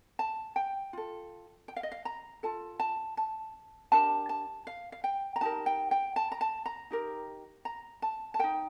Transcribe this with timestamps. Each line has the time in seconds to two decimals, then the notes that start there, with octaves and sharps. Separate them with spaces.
0.19 A5
0.56 G5
0.93 F4 A4
1.68 G5
1.76 F5
1.83 D#5
1.92 F5
2.05 A#5
2.43 F4 A4 A5
2.80 A5
3.17 A5
3.92 D4 G4 A#4 A5
4.29 A5
4.67 F5
4.92 F5
5.04 G5
5.36 A#5
5.41 D#4 G4 A#4 A5
5.66 G5
5.91 G5
6.16 A5
6.32 A#5
6.41 A5
6.66 A#5
6.91 D#4 G4 A#4
7.65 A#5
8.02 A5
8.34 A5
8.39 D#4 A#4 G5